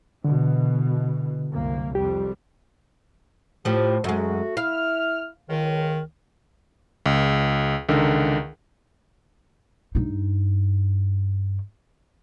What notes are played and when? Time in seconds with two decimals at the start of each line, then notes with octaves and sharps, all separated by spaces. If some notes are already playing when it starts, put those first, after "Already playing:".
0.24 B2 D3 E3
1.52 C2 F#2 A#3
1.95 F2 G3 G4
3.65 A2 F3 G4
4.04 F#2 G#3 A3 F#4
4.57 E4 F5 F6
5.49 C#2 D#3
7.06 C#2
7.89 C#2 D3 D#3 A#4
9.95 G2 D#4